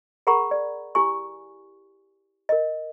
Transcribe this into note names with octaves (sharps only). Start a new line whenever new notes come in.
G#4 A#4 F#5 A#5 B5 C#6
D5
E4 G4 G#5 C#6
A#4 D#5